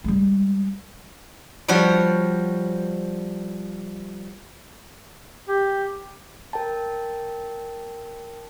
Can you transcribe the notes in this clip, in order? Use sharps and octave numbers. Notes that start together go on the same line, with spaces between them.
G3 G#3
F3 G3 F#4 C#5
G4
A#4 G5 A5